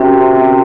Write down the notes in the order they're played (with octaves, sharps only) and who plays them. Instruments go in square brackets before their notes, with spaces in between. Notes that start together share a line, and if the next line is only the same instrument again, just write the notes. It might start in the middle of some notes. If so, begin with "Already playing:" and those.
Already playing: [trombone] C3 [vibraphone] C#4 F#4 A#4
[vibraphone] C4